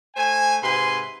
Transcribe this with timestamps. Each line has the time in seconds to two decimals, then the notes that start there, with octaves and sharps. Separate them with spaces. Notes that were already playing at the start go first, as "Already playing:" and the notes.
0.16 A3 C5 G#5
0.62 G#2 C3 B4 G#5 C6